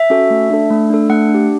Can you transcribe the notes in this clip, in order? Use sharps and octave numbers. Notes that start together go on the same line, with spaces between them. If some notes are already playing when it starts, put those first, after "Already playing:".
Already playing: E5
C#4 F#4 A4
A3
D4 A4
A3
D4 A4
A3 F#5
D4
G4